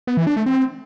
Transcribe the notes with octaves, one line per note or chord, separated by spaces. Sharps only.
B3
E3
D4
A3
C4